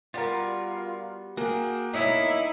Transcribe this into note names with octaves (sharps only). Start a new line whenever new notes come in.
G3 B3 F4 F#4 A#4 A6
A#3 F#4 G#4 G5
B2 D#4 E4 C#5 D#5